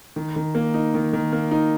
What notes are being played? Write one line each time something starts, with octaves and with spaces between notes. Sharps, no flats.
D#3
D#3
A#3
D#4
D#3
D#3
A#3
D#4